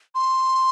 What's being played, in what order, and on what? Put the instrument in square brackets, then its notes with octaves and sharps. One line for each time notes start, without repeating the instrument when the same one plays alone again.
[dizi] C6